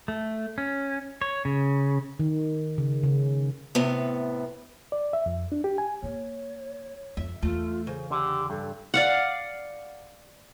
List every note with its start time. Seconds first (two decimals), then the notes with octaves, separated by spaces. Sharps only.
0.08 A3
0.58 C#4
1.21 C#5
1.45 C#3
2.20 D#3
2.78 C#3
3.03 C#3
3.75 A2 C3 B3
4.92 D5
5.13 E5
5.26 F2
5.52 D4
5.64 G4
5.78 G#5
6.03 A#3 C#5
7.17 F2 E5
7.43 E2 A3 F4
7.87 C#3 C5
8.10 D3 G4
8.50 G2 A4
8.94 D5 F5 F#5